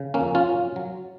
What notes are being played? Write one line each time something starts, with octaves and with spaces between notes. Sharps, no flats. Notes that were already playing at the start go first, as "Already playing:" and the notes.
Already playing: C#3
A#3 C#4
F2
C#4 F4
F#3
F#3